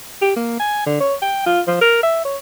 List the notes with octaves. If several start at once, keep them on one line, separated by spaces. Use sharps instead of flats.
G4
A#3
G#5
D3
C#5
G5
F4
F3
A#4
E5
C#5